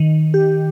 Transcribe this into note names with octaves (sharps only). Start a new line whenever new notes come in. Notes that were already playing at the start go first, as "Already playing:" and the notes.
Already playing: D#3
G4